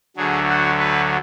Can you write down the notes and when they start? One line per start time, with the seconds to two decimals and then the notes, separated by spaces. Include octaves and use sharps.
0.17 D2 D3 F#3 G#4
0.49 F#4
0.79 B4